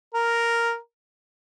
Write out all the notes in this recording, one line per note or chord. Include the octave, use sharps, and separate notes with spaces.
A#4